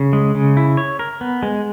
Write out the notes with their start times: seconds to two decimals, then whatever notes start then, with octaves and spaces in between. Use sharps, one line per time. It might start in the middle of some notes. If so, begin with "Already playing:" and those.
Already playing: C#3
0.13 G#3
0.35 C#3
0.57 E4
0.77 C#5
0.99 A#4
1.21 B3
1.43 G#3